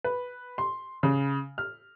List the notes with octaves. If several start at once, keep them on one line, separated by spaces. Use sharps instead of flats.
B4
C6
C#3
F6